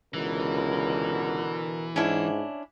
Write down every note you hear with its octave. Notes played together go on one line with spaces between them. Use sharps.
C#2 B2 D3 E3 A#4
G#2 C#4 D4 E4